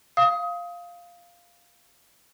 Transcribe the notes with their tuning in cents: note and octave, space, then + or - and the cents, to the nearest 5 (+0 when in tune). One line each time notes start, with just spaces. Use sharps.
F5 +0 D#6 +25